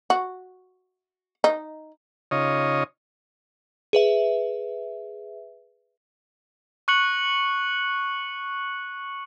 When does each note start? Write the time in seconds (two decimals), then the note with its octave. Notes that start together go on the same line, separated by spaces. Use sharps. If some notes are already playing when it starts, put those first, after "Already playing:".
0.10 F#4
1.44 D#4
2.31 C#3 D#4 F4 C#5 D#5
3.93 G#4 B4 E5
6.88 C#6 F#6 C#7 F#7